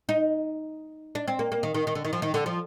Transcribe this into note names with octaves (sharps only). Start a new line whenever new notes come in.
D#4
D4
C4
A#3
A#3
D#3
D#3
D#3
D3
D#3
F3
D#3
D3
F3